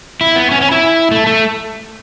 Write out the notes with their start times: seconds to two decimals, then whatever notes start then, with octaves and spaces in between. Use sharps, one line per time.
0.21 E4
0.36 B3
0.51 C#4
0.61 C#4
0.71 E4
1.11 A3
1.27 A3